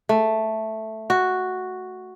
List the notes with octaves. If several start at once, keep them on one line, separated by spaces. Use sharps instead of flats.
A3
F#4